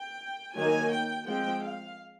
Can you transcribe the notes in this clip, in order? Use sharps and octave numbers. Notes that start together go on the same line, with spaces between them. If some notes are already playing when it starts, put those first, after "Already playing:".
Already playing: G5
D#3 F#3 A#3 G#5
G5
F3 G#3 C4 G5
F5